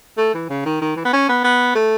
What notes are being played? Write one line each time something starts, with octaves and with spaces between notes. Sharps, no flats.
A3
E3
C#3
D#3
D#3
E3
B3
C#4
B3
B3
A3